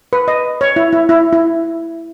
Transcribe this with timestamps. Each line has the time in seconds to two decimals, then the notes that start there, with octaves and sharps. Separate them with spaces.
0.13 B4
0.28 D#5
0.61 C#5
0.76 E4
0.93 E4
1.09 E4
1.33 E4